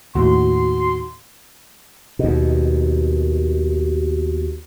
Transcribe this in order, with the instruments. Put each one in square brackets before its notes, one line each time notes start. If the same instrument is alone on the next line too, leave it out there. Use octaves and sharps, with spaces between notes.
[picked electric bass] D#2 A2 [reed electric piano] F#4 [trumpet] C6
[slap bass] D#2 B2